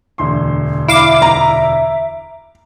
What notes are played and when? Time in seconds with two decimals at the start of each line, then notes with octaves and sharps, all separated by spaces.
0.18 E1 D2 C6
0.88 E4 E5 F5 D6
1.22 A#5